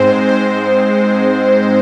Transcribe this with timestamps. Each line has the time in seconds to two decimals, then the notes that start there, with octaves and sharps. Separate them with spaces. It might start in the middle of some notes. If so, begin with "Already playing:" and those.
Already playing: G#2 G#3 C4 C5
0.27 C5